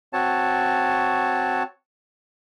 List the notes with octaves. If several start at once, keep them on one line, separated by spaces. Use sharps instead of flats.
C4 F#4 C#5 A5